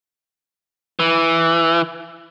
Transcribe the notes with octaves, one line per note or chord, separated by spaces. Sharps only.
E3